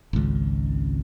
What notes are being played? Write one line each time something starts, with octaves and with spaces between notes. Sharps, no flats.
G#1 C#2